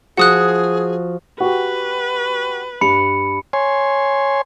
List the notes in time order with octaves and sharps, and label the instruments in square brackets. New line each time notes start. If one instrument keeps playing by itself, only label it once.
[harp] F3 F#4 [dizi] G#4 [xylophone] F#5 D#6 F#6
[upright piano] F#4 G4 [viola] B4
[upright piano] G2 [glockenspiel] B5 C#7
[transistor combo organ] C#5 G#5 C6